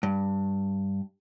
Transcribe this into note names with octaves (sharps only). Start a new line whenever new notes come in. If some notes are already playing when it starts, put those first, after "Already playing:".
G2